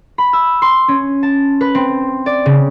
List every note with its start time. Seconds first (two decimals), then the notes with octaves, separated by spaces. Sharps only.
0.18 B5
0.33 E6
0.62 C6
0.88 C#4
1.23 A5
1.61 B4
1.75 C4
2.26 D5
2.46 C#3